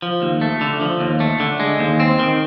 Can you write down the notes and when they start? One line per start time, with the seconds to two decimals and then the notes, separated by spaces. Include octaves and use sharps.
0.02 F3
0.22 D#2
0.41 A3
0.61 D3
0.81 F3
1.00 D#2
1.20 A3
1.40 D3
1.60 G#3
1.79 D#2
2.00 C4
2.19 D#3